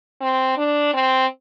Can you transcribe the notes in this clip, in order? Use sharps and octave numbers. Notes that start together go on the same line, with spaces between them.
C4
D4
C4